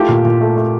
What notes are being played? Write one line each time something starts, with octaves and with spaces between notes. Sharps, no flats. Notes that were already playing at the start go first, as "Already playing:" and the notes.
Already playing: A3 F4 G4
A#2
A#2
A3
A3